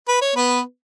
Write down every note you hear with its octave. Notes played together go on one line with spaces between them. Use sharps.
B4
C#5
B3 B4